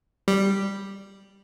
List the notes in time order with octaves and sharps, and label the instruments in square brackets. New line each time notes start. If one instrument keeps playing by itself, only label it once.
[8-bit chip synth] G3